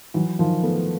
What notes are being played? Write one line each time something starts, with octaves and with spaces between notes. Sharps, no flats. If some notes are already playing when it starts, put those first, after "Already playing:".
E3 F#3
D#3 F3
A3 B3